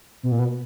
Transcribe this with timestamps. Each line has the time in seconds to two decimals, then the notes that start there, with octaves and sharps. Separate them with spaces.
0.23 B2
0.31 A#2
0.39 B2